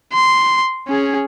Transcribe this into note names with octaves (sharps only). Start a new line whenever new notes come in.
C6
C#4 G#4